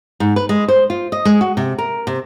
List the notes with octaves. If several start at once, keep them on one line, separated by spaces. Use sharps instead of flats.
G#2
B4
G#3
C5
F4
D#5
G#3
F#4
C3
A#4
C3